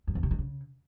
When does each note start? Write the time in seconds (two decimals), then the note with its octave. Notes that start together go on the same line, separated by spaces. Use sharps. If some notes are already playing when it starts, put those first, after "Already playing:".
0.07 F#2
0.15 E2
0.23 C3
0.31 D#3
0.39 C#3